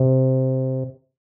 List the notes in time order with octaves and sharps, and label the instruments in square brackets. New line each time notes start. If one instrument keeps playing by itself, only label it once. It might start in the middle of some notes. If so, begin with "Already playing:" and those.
Already playing: [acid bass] C3